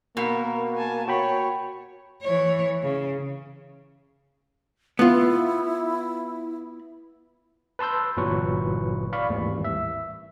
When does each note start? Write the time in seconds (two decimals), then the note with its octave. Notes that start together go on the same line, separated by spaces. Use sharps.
0.17 B2 A#3 A#4
0.77 G#5 A5
1.08 F#4 C#5 G5 B5
2.23 E3 C#5
2.83 C#3
4.99 B3 E4 F4
7.79 B4 A5 C6 E6 G6
8.17 G1 A#2 E3 F#3 B4 C#6
9.13 D5 F5 B5 C#6
9.30 G#1 D#2 A2 E3 G3
9.64 E5